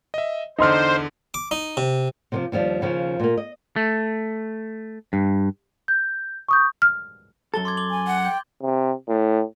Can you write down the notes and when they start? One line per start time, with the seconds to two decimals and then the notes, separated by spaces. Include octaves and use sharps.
0.14 D#5 E5
0.58 E2 D3 D#4 C5 C6 F6
1.34 D6
1.51 D#4
1.77 C3
2.32 C3 D#3 F3
2.52 D#2 F3 G3 D4
2.81 D#2 C#3 F3
3.20 A#2 A#3
3.37 D#5
3.76 A3
5.13 G2
5.88 G6
6.49 C#6 D#6 G6
6.82 F6
7.54 F#2 A4 A6 G7
7.65 C6 D6 G#6
7.77 D6 F#7 G7
7.91 G#5
8.07 F#5
8.25 G5 G6
8.62 C3
9.08 A2